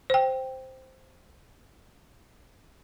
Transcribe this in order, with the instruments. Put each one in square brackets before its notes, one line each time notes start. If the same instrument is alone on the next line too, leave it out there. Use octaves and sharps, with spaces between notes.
[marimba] C5 G5